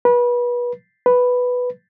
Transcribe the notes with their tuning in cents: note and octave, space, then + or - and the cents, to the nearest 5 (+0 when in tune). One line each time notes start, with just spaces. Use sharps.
B4 -30
B4 +0